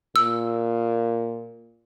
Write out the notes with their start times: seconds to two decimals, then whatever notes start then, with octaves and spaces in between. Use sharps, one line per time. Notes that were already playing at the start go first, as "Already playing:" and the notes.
0.16 A#2 E6